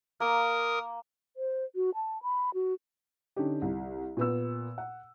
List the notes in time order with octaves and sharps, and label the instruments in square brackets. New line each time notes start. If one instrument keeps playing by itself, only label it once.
[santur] A#3 [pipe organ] A#4 D#6
[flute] C5
F#4
A5
B5
F#4
[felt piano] D3 C#4 D#4 G4
C2
A#2 B3 E6
F#5